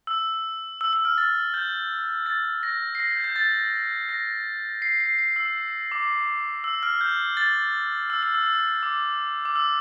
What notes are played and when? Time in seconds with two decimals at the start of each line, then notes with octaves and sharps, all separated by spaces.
0.07 E6
0.81 E6
0.93 E6
1.05 F6
1.18 A6
1.54 G6
2.26 A6
2.63 A#6
2.95 C7
3.00 A#6
3.12 G6
3.24 G6
3.36 A6
4.09 A#6
4.82 C7
5.00 C7
5.19 C7
5.36 E6
5.92 D6
6.64 E6
6.83 F6
7.01 G6
7.37 A6
8.10 E6
8.23 E6
8.34 E6
8.46 E6
8.83 D6
9.45 D6
9.56 E6